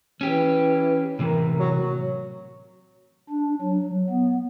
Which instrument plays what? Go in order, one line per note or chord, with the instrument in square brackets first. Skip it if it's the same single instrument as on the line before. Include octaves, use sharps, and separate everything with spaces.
[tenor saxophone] E3 [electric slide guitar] C#4 G4
[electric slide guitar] A2 C3 E3 [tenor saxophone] A#4
[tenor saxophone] F#3
F#3
[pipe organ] D4
F#3
B3